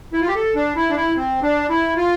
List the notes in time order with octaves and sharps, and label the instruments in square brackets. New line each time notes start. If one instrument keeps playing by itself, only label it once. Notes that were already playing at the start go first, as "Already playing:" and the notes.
[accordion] E4
F4
G4
A4
D4
E4
D4
E4
C4
D4
E4
F4